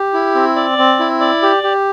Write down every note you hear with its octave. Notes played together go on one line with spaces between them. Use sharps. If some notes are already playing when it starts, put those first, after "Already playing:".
Already playing: G4
E4
C4
D5
C4
E4
D5
G4
G4